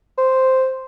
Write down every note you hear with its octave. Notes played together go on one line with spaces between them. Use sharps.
C5